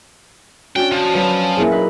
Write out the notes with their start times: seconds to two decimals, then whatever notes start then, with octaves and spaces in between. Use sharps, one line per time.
0.76 C#4 D4 F#4 G5
0.92 F3
1.15 F3 F#3 B4
1.57 A#2 A#3 E4 G#4
1.71 D#4 B4